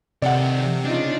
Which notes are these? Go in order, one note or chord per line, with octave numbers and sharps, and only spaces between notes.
C3 D#3 A4 D5 F#5
C#3 D4 D#4 F4